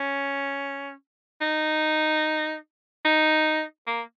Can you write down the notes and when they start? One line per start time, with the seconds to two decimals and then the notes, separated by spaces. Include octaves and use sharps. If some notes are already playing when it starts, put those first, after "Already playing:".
Already playing: C#4
1.41 D#4
3.05 D#4
3.87 A#3